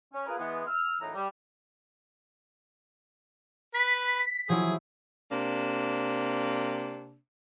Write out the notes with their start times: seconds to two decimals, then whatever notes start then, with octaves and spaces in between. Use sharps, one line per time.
0.13 C#4
0.26 F4 G#4 A#4 B4
0.38 E3 G#3 B3
0.67 E6 F6
1.01 F#2 A2 E3 D#4 A#5
1.14 G3
3.74 B4 B6
4.49 F3 F#3 E4 G#4
5.31 C3 A#3 D4